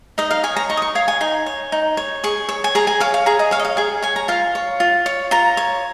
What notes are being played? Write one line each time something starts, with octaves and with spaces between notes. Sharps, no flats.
D#4 D#5
F5
C#5 G#5
A#5
D#4 C#6
D#6
C#6
C#5 F5
G#5
D#4 G#5
C#5
D#4
C#5
G#4 C#6
C#5
G#5
G#4 A#5
G#5
C#5 F5
F5
G#4 A#5
D#5
C#5 F5
D#5
F5
G#4 G#5
C#5 G#5
A#5
F4 F5
C#5
F4
C#5
F4 A#5
C#5